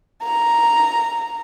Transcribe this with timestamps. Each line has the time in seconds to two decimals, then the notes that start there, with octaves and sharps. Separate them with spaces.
0.23 A#5